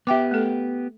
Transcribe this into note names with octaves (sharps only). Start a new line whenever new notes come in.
B3 G4 E5 G5 D6
A3 A4